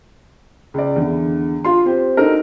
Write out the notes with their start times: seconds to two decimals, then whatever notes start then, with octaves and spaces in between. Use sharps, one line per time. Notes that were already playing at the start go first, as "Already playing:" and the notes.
0.74 C#2 D5
0.96 E2 D3
1.65 F4 C6
1.85 C4 G4 C5
2.17 D4 D#4 F#4 A4 A#4